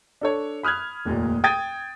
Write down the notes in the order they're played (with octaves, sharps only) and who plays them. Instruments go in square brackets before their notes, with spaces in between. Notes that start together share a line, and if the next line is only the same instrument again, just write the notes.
[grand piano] D4 A4 C#5
B5 D#6 F6 F#6 G#6
F1 D#2 A#2
G5 D#6 G#6 A6 D#7